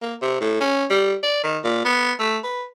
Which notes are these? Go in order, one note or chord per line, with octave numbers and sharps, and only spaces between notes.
A#3
C3
A2
C#4
G3
D5
D#3
A#2
B3
A3
B4